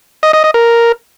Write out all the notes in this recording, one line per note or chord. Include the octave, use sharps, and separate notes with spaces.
D#5
D#5
D#5
A#4